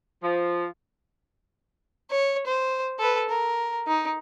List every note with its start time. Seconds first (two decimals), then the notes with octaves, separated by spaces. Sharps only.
0.23 F3
2.11 C#5
2.47 C5
2.99 A4 B4
3.30 A#4
3.87 D#4